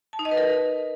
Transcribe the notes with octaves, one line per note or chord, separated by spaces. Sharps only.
A5
D#4
D#5
B4
A#4